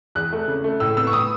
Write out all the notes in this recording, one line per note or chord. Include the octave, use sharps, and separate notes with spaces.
E2 F#6
A3
C#3
A3
A2 E6
B3 E6
C#6
D#6